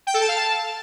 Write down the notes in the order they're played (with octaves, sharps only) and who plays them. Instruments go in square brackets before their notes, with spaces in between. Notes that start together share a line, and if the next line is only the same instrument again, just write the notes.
[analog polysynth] G5
A4
A5
F5
A5